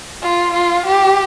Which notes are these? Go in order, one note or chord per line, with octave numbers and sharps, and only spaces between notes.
F4
F4
G4